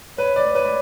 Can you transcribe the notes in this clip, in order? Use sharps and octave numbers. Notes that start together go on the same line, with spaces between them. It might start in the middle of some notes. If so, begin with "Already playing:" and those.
B4 C#5
D5
B4 C#5
D5